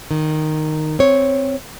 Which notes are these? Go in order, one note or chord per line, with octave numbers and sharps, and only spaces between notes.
D#3
C4 C#5